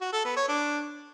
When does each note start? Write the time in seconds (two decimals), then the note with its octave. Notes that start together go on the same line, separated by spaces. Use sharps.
0.01 F#4
0.13 A4
0.25 B3
0.36 C#5
0.48 D4